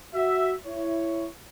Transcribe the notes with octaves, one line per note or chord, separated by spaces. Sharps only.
F#4 E5
E4 C#5